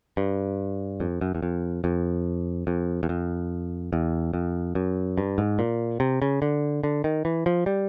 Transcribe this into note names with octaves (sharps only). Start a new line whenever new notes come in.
G2
F2
F#2
E2
F2
F2
F2
E2
F2
E2
F2
F#2
G2
G#2
A#2
C3
C#3
D3
D3
D#3
E3
F3
G3